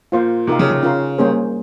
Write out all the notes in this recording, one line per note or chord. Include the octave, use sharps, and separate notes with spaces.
A#2 F4 C5 F5
C3 D#4 A#4 F5
C#3
C#3
C#4 F4 A#4 F5
G3 A#3 C#4 G#4 C5